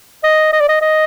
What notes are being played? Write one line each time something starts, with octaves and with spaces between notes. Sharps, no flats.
D#5
D#5
D5
D#5
D#5